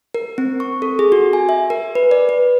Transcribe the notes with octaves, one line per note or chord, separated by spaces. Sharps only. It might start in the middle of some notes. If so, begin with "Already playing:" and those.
A#4
C4
C#6
A4
G#4
F#4
G#5
E5
A#4
B4
D5
B4